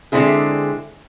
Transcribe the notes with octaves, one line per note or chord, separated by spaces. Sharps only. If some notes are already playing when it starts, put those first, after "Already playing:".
D3 G#3 C4 E4 G#4